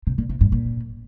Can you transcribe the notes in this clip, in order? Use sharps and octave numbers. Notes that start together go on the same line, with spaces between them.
C3
A#2
C3
G2
A#2